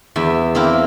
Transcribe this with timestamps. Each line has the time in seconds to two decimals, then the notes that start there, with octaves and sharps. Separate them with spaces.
0.16 E2 E5
0.55 A#3 C4 E4